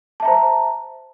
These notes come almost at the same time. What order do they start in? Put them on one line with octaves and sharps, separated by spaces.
A5 E5 A#5 C5